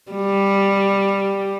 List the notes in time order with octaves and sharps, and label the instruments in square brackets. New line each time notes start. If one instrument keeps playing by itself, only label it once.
[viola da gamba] G3